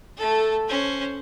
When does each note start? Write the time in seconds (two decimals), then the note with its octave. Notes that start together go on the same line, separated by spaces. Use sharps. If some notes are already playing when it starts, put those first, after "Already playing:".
0.17 A3 A4
0.68 C#4 C5